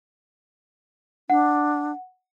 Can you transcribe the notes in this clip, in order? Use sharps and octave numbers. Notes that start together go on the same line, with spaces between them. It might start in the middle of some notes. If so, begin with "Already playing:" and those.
D4 F#5